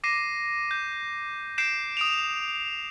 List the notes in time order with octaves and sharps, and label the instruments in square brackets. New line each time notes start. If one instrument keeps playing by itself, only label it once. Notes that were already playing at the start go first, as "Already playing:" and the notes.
[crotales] D6 A#6 C7 D#7
G6
G6 C7 D7 E7
D#6 D7 F7